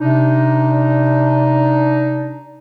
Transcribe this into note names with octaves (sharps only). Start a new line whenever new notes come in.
C3 D4 D#4